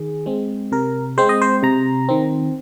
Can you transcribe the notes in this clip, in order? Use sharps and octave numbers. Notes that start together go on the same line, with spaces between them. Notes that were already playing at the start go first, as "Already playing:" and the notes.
Already playing: D#3 G#4
G#3 C4
C3 A#4
G#3 C4 C5
D#5
C5
C3 A#5
D#3 C4